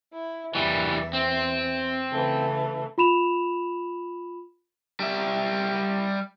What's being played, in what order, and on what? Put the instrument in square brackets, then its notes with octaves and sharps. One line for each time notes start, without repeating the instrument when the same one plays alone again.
[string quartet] E4
[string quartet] E2 E5 [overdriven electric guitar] E3 G3
[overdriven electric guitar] C4
[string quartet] C#3 E3 A3
[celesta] F4 B5 E7 F7
[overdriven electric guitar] G3 E5